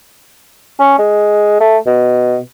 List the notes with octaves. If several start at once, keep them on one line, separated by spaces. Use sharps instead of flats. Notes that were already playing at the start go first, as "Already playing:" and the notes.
C#4
G#3
A3
B2